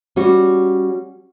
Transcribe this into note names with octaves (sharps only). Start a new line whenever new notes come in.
G3 C#4 F#4